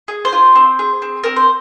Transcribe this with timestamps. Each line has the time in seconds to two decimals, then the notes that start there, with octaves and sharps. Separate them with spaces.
0.08 G#4
0.25 C5
0.33 F4
0.56 C4
0.79 G#4
1.02 C4
1.24 C4 A#4
1.36 C5